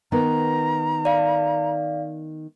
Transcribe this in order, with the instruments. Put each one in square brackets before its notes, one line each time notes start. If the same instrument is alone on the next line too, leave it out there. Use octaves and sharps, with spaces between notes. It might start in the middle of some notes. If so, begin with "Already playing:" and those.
[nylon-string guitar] D#3 B3 [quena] A#5
[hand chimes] D5 F5